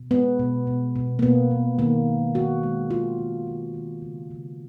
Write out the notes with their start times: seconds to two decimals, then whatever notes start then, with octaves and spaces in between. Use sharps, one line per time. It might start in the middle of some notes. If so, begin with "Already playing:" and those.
Already playing: B2
0.11 G#3 B3
0.39 B2
0.67 B2
0.96 B2
1.19 A#3
1.23 B2 B3
1.51 B2
1.79 D#3 A#3
2.07 G#3
2.34 D#3 F#4
2.63 G#3
2.90 D#3 F4
3.19 D#3
3.47 D#3
3.74 D#3
4.02 C#3
4.31 C#3